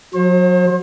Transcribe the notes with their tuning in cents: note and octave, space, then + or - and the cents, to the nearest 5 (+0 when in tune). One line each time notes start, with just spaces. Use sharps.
F#3 -30 C5 +40